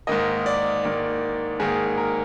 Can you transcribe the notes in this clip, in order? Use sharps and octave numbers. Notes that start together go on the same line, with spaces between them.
G#2 D#3 A#3 D#5
D5
G#2 D#3 A#3
G#2 D#3 A#3 G#4
A#4